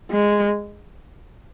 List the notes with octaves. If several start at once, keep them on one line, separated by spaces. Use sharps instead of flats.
G#3